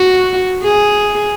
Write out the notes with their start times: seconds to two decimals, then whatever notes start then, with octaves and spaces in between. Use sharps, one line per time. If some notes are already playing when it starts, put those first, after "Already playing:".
Already playing: F#4
0.63 G#4